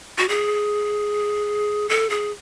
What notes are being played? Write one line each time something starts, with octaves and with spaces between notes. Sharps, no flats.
F#4
G#4
A4
G#4